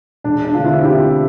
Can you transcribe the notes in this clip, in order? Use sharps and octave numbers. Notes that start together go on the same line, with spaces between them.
E1 D4
D4
D2 D3 F4
C4 E4
E1 E4 G4
D3